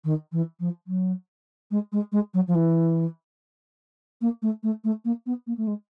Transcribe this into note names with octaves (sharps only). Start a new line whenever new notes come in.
D#3
E3
F3
F#3
G#3
G#3
G#3
F#3
F3
E3
A#3
A3
A3
A3
A#3
B3
A#3
A3
G#3